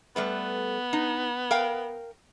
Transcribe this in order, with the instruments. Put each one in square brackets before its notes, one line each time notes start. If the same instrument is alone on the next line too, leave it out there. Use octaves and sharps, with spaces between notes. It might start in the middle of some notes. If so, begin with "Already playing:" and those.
[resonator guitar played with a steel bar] G3 A3 B4 [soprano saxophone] B3
[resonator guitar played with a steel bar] D#4
A#4 F5 G5